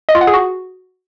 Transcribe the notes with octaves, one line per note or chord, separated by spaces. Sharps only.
D#5
F4
F#5
G#4
F#4